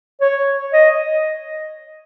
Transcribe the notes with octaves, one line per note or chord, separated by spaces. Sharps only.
C#5
D#5